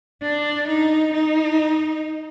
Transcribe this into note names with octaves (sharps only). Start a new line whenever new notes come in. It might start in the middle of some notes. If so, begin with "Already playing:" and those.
D4
D#4
D#4